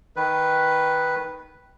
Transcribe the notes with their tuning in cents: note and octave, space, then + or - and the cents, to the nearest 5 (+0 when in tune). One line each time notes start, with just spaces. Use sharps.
D#3 +5 B4 +0